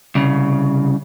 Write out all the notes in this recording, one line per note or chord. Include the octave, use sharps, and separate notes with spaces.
C2 C#3